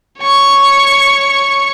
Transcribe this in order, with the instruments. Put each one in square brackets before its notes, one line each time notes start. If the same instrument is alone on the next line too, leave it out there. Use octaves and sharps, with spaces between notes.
[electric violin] C#5 C#6